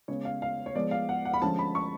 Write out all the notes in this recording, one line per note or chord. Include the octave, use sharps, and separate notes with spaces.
C#3 G#3 B3 C#5
F5
F5
C#5
F3 G#3 B3 D5
F5
F#5
F#5
B5
D3 F3 G#3 C#4 A5
B5
C#6